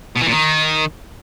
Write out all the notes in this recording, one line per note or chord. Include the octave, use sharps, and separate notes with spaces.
B2
E3
A#2
D#3